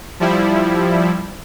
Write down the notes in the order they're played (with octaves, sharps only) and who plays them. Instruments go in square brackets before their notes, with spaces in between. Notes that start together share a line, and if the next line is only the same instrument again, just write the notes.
[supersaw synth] F3 G3 E4